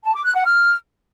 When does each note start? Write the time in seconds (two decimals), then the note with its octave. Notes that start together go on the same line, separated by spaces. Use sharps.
0.04 A5
0.14 D6
0.25 F#6
0.35 F#5
0.45 F6